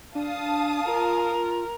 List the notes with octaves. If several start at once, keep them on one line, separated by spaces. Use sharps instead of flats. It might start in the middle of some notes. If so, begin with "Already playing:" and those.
D4 F5 A5 D#6
F4 A#4